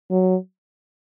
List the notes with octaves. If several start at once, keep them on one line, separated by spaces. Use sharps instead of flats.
F#3